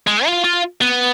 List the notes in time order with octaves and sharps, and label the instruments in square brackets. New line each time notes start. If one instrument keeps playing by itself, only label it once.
[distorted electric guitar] G#3
F4
F4
B3